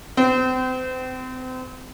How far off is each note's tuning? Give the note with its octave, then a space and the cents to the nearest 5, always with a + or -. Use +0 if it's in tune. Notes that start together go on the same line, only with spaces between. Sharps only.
C4 -35